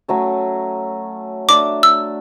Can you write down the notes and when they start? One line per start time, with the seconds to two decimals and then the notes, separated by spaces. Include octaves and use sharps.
0.08 F#3 A3 C#4
1.49 A3 D4 A4 E5 D6
1.83 E6